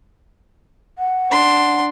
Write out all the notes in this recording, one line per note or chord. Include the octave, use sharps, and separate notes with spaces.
F#5
D4 C6